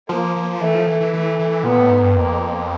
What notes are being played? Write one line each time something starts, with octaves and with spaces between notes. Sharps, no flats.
F3 A#3
F3
E3 A3
F3
E3
E3
E3 A3
E3
A#2 B3
A2
G#2
G2
F2 A#3